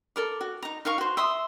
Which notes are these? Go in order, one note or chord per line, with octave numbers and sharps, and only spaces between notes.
A4 A#4 D5
F#4
D#4 A#5
D#4 A#4 F5 C#6
F#4 C5
E5 C6 D#6